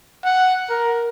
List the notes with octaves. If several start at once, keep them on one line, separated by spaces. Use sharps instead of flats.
F#5
A#4